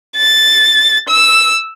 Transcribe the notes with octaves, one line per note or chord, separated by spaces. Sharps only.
A6
E6